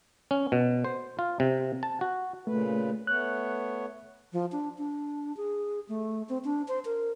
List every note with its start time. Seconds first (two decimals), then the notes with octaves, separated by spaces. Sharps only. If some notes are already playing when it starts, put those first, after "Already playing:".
0.31 C#4
0.52 B2
0.85 C5
1.19 F4
1.40 C3
1.83 A5
2.01 F#4
2.47 A#2 C#3 A3 B4
3.07 A3 B3 C#5 F#6
4.33 F3
4.52 D4
4.78 D4
5.37 G#4
5.89 A3
6.29 C4
6.44 D4
6.68 C5
6.85 A#4